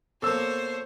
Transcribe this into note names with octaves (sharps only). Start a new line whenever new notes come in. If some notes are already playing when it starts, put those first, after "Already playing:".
B2 A#3 A4 C5 C#5 E6